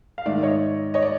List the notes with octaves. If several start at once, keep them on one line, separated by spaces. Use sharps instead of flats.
F5
G#2 D#3 D5 E5
C#5 D#5
C#5 D#5
D5